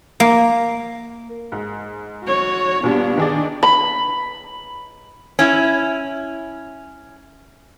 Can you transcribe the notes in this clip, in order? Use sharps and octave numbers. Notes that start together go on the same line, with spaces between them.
A#3
G#2
F#4 C#5
A#2 G3 B3 D4
D#3 D4 G#4 D5
B5
C#4 E4